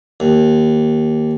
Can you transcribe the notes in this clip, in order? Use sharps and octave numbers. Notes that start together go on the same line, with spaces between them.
D#2